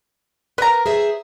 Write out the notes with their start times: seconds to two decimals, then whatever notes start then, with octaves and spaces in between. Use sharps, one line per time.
0.58 A#4 B4 A#5
0.86 G#4 C5 E5